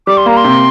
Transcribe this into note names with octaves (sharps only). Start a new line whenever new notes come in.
G3 D6
C6
A#3 A#5
C6
C3